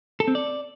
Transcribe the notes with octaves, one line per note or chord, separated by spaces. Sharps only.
A4
C4
D5